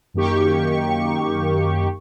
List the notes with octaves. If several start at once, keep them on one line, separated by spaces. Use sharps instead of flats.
F#2 D#3 A#3 G4 C#6